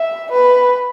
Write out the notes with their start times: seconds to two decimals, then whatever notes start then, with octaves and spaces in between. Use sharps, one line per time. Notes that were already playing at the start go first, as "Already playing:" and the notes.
Already playing: E5
0.32 B4